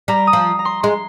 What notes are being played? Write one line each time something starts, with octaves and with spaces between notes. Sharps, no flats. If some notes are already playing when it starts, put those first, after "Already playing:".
G3 A#5
D#6
F3
A#5
C6
G#3 C6